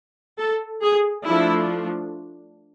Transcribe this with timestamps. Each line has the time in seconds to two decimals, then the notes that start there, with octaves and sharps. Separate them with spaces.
0.39 A4
0.82 G#4
1.25 F3 A3 D4 E4